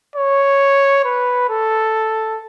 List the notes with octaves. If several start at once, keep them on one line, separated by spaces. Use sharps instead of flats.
C#5
B4
A4